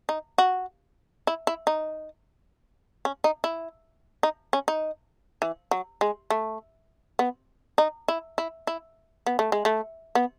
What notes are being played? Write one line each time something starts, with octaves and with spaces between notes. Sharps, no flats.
D#4
F#4
E4
E4
D#4
C#4
D#4
E4
D#4
C#4
D#4
E3
F#3
G#3
A3
B3
D#4
E4
E4
E4
B3
A3
G#3
A3
B3